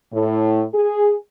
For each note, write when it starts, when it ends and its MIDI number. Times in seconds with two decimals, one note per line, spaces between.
0.13 0.64 45
0.74 1.15 68